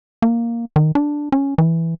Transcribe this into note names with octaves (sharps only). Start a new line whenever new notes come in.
A#3
D#3
D4
C#4
E3